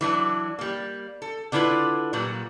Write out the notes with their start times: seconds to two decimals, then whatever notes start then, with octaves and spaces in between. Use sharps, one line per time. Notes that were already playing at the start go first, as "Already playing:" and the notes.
0.01 E3 F#3 D4
0.59 G3 A#3
1.22 A4
1.52 D3 D4 E4 F4 B4
2.13 A#2 F#3 G3 A#3